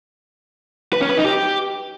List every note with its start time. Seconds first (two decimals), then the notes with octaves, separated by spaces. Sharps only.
0.93 B4
1.01 C#4
1.09 B4
1.17 D#4
1.26 G4